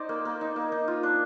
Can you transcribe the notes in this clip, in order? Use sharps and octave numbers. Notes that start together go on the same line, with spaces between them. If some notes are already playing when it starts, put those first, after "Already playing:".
Already playing: D#4 C5 D5
A#3
A#3
D#4
A#3
D#4
F4
D4